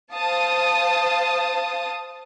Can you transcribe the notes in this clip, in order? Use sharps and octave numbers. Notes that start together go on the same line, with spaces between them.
C5 F5 A5 D#6